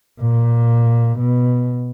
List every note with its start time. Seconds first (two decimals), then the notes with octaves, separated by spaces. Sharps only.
0.21 A#2
1.19 B2